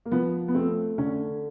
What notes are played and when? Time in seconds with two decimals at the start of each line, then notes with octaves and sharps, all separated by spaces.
0.06 A#3
0.11 F3 B3
0.48 B3
0.55 A3 C4
0.98 D3 C#4